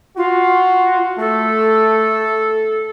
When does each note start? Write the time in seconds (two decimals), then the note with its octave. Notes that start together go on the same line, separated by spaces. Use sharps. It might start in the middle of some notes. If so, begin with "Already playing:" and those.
0.17 F4 F#4
1.19 A3 A4